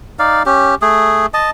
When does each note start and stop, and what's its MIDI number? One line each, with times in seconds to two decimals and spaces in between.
0.19 0.43 63
0.19 0.43 74
0.19 0.43 77
0.46 0.75 61
0.46 0.75 67
0.82 1.26 57
0.82 1.26 68
1.34 1.50 75
1.34 1.50 81